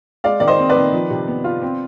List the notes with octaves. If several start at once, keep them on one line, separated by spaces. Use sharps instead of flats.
G#3 D5 F5
D#3 D5
C5 D#5
C4
B4 D5
D#3
F3
C3
B3
F4
C4